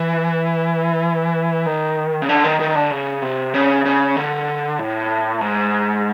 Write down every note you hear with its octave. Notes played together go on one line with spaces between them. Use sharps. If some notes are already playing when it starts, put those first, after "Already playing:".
Already playing: E3
D#3
C#3
D3
D#3
D#3
D3
C#3
C3
C#3
C#3
D3
A2
G#2